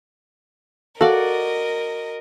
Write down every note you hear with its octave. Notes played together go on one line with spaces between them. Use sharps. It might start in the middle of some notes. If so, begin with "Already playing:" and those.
F#4 A4 A#4 D5 D#5 F5